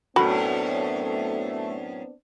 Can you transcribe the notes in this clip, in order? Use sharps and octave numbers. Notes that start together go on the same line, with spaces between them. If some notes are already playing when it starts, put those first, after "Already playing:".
F#2 A2 A3 B3 C4 D4 F#4 B5